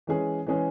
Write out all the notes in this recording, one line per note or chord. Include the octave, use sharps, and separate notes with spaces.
E3 G#3 C#4 G#4
E3 G#3 C#4 G#4